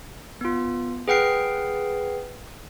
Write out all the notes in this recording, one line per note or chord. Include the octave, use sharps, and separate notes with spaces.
B3 F4
G#4 B4 F#5 G5 F6 C7